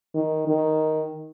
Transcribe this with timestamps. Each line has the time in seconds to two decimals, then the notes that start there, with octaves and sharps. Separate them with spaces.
0.15 D#3
0.47 D#3